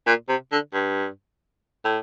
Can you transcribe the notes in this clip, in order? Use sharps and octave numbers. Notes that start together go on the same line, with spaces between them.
A#2
C3
D3
G2
A2